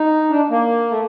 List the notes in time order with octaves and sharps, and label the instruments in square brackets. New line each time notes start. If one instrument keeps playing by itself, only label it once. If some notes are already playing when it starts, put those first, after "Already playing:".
Already playing: [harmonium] D#4
D4
A#3
A3